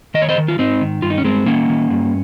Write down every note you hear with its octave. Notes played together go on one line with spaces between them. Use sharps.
D#3 D#5
C#5
C5 D#5
D#3
F4
G#2 C4 D#4
D#3
G2 F4
D#4
C#4
G2 G#3 C4
D#3 A#3 C#4
D#3
G2